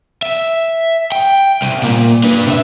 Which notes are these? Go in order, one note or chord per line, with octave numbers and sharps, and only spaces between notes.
E5
G5
C2
A#2 A#3
D4 B4
C3 E5